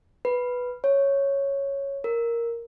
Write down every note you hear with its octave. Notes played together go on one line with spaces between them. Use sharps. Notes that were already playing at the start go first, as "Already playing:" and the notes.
B4
C#5
A#4